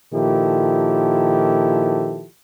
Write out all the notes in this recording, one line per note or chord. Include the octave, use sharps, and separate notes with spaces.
A#2 D#3 F3 E4 G4 A4